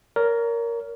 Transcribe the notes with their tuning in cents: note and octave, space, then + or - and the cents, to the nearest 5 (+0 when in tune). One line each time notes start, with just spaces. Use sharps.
A#4 +0 C#5 +40